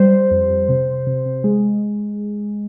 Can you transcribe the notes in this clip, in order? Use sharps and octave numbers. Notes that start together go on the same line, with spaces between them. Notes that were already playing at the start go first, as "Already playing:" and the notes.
Already playing: G3 C5
G3
F2
F2
C3
C3
C3
C3
G#3